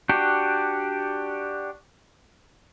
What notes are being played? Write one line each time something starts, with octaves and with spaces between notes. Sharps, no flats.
D4 F#4 G4